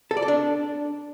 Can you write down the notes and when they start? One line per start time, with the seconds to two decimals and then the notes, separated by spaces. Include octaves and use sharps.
0.11 A4
0.17 D5
0.22 A4
0.28 D4